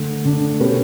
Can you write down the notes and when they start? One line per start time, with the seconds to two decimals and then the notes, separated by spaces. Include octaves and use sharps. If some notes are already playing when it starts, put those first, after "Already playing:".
Already playing: D3 A3 D4
0.25 D3 A3 D4
0.59 B2 A3 C#4 G4 B4